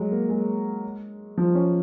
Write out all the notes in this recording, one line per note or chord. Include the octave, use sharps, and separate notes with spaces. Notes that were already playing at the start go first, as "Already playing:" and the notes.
Already playing: F#3 G#3
A#3
G#3
F3
C#4